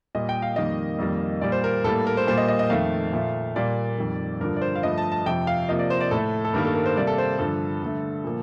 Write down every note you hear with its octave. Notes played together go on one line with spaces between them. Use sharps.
A#2 G3 A#3 D#5
G5
F5
F2 D#3 G3 A#3 D#5
F2 D#3 G3 A#3
A#2 G3 A#3 D5
C5
A#4
A2 G3 A#3 A4
A#4
C5
A#2 G3 A#3 C5
D#5
D#5
D#5
F2 D#3 A3 F5
A#2 F3 A3
A#2 G3 A#3 D5
F2 D#3 G3
G2 D3 F3 A#4
D5
C5
F5
G2 F3 A3 D#5
A5
A5
F2 C3 F3 G5
F5
C3 F3 A#3 D#5
D5
C5
D5
A2 A3 A4
A4
G2 D#3 G3 A#3 A#4
A4
A#4
C5
C3 G3 A#3 D5
A4
C5
G2 D3 F3 A4
G2 D3 A3
A#2 F3 A#3